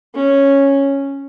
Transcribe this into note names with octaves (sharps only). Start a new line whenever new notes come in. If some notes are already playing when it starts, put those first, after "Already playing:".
C#4